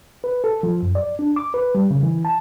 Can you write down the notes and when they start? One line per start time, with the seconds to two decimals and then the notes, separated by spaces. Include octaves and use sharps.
0.24 B4
0.44 A4
0.63 F3
0.83 F#2
0.95 D5
1.19 D4
1.36 D6
1.54 B4
1.75 G3
1.90 C#3
2.03 E3
2.25 A5